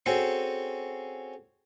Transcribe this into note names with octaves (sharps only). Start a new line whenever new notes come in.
C4 C#4 F#4 G#4 A4 C5